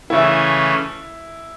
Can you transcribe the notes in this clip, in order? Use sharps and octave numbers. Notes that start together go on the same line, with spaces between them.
C#3 E3 A3 C#4 E4